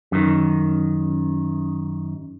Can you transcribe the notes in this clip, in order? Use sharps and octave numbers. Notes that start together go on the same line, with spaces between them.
F#2 D#3